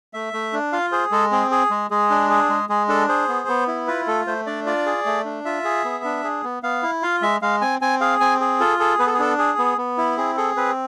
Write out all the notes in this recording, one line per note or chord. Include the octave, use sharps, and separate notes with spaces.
A3 E5
A3
D4
F4 F5
G#4 C5
G#3 A4
C4 G#4
G#4
G#3
G#3 G#4
D4
G#4
G#3
G#3 G#4
D4 A4
G#4 C5
B3
B3
E4
F4 B4
A3 A4
A3 C5
D4 D5
F4 D5
G#4
A3
D4
F4 E5
G#4
B3
D4
G#4
B3
B3 F5
E4
F4 F5
G#3 E5
G#3 F5
C4 G#5
C4 G#5
G#4 F5
C4 G#5
G#4
F4 A4
G#4 A4
B3 B4
A4
G#4
D4 A4
G#4
B3
B3
E4
C4 G#4
G#4 A4
C4 B4